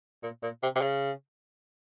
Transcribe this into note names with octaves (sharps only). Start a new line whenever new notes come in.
A#2
A#2
C3
C3
C#3